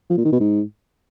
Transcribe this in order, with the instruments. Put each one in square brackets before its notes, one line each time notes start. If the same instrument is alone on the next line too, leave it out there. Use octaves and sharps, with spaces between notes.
[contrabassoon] F3
A#2
D#3
B2
G#2